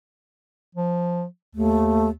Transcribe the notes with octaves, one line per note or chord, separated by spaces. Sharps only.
F3
D#2 A3